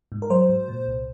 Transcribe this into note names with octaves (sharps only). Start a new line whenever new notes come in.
G#2
A#4
F#3 C5
G#2
A#2
C2